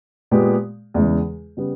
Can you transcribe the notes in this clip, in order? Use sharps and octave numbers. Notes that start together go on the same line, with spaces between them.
A#2 G#3 B3 G4
E2 C#3 E3 G#3
C#3 G3 B3